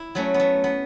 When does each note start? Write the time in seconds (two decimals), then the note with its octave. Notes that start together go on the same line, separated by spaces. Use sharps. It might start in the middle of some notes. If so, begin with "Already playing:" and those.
Already playing: E4
0.15 F#3 A3 C#4
0.34 B3
0.40 A3
0.64 B3